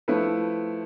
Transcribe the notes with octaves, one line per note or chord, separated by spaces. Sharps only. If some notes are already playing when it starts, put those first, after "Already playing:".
F3 A3 E4 B4